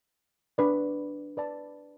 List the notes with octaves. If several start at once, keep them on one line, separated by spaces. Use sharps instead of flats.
D4 B4 D5
B4 D5 A5